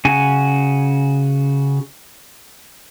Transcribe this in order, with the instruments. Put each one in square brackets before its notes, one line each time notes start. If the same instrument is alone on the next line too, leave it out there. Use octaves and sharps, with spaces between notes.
[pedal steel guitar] C#3 F#4 G#5